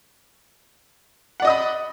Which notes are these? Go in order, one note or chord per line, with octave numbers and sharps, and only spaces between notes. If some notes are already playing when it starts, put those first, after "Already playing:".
D5 D#5 F#5 B5 D#6